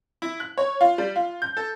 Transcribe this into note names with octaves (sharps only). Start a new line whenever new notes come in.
E4
F#6
C#5
F4
G3
F4
G6
A4